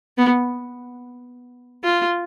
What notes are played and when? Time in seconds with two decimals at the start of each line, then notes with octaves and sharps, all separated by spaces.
0.18 B3
1.84 F4